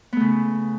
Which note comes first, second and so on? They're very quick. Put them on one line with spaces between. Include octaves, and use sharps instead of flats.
B3 A3 C#3